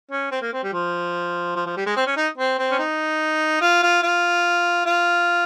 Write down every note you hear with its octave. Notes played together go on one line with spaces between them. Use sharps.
C#4
C4
A#3
C4
G3
F3
F3
F3
G3
G#3
C4
C#4
D#4
C4
C4
C#4
D#4
F4
F4
F4
F4